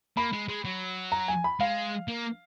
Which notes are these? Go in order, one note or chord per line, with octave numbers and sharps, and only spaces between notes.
A#3 B5
G#3
G#3
F#3
A#5
G#5
B5
G#3 F5
A#3